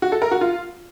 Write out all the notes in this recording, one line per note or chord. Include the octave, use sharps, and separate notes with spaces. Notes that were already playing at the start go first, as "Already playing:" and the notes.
F#4
A4
A#4
F#4
F4